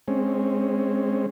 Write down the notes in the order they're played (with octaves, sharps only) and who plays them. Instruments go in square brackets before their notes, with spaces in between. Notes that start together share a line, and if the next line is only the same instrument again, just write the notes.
[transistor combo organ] G#3 C4 C#4